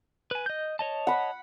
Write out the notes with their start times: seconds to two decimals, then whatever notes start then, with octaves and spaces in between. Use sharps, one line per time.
0.31 B4 G#5
0.46 D#5 G6
0.79 C#5 D#5 A5
1.07 F#5 B5